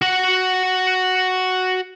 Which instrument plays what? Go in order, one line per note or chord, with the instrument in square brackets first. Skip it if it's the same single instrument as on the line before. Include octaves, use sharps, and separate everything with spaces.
[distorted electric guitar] F#4 F#5